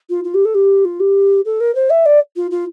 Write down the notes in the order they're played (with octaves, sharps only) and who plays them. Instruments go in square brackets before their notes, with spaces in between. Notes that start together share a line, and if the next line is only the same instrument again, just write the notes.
[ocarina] F4
F4
G4
A4
G4
F4
G4
A4
A#4
C5
E5
D5
F4
F4